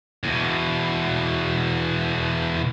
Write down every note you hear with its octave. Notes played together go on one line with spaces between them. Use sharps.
E2 B2